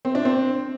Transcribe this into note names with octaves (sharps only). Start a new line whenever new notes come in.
C4
D4
C4